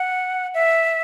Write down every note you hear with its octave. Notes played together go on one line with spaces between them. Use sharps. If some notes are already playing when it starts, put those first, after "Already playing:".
Already playing: F#5
E5